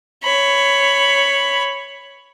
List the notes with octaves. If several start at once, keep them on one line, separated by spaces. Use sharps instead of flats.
C#5 B5